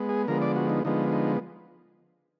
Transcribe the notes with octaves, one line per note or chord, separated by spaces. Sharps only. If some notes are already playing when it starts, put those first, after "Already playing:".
Already playing: G#3 B3
G#4
D3 F3 G#3 B3 A#4
D5
F#4
D#4
D3 F3 G#3 B3 D#4
D#4